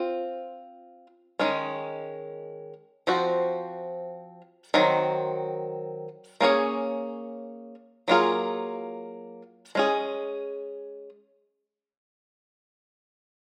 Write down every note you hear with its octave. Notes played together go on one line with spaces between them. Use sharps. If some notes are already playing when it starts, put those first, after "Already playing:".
Already playing: C4 F4 C5
D#3 G#3 C#4
F3 C4 F#4
D#3 F#3 C4
A#3 C#4 G#4 C#5
F#3 A#3 F4 G#4
G#3 C#4 G#4